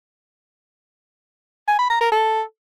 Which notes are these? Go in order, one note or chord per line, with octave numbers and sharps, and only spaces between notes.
G#5
B5
A#5
A#4
A4